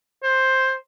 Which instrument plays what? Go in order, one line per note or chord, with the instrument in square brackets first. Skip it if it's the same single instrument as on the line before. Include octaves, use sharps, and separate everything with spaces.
[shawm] C5